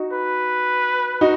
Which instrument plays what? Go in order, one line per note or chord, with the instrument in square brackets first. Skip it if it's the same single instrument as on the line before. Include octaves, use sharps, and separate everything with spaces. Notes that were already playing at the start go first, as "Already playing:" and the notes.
Already playing: [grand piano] D#4 F#4
[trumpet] B4
[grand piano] D#4 F#4